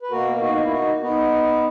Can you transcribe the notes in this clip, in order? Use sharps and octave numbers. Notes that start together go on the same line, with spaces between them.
B4
B2 A#3 F#4 A#4
D#4 F#4
D#4
E4
D#4 F#4
B3 D#4